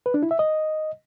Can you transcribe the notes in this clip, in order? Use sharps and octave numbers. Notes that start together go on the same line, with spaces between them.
B4
D4
E4
E5
D#5